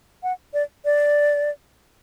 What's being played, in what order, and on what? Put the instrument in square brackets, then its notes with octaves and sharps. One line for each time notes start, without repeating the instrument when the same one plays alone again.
[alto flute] F#5
D5
D5